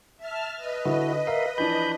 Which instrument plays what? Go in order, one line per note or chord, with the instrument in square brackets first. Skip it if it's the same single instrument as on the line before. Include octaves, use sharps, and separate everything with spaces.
[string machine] E5 A5 F6
B4 D#5
[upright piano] D3 [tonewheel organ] E4 F#4
[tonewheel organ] A#4 E5 F5 [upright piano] B6
[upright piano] E3 F3 D4 [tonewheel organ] B5 G6